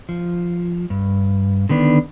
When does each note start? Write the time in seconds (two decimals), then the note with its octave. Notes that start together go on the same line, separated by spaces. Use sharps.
0.09 F3
0.90 G2
1.69 D3 D#3 B3 D4